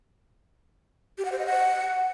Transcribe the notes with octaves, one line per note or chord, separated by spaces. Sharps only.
G4
F#5
C5
D#5
F#5